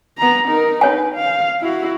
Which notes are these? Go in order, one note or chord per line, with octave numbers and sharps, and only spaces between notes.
B3 A#5
D#4 A#4
D4 B4 C#5 G#5
F5
E4 F#4